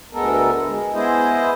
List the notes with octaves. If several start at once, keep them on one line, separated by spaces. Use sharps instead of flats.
D2 G#3 B3 A4 A#4
G#3
B3 E4 G#4 C5 D#5